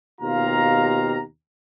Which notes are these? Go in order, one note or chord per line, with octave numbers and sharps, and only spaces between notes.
D#2 B2 F4 G4 F5 A#5